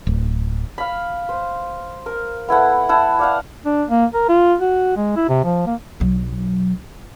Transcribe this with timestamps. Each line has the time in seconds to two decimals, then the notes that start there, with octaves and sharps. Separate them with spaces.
0.07 D1
0.78 F5 B5
1.29 C5
2.06 A#4
2.48 B3 E4 A4 F#5
2.89 E4 F#5 A5
3.19 D5 F5 F#5
3.65 D4
3.89 A#3
4.14 A#4
4.29 F4
4.60 F#4
4.96 G#3
5.16 E4
5.29 C3
5.44 F3
5.66 A#3
6.00 B1 F#3